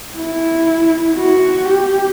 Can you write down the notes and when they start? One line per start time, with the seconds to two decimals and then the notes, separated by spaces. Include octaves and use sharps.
0.17 E4
1.15 F#4
1.65 G4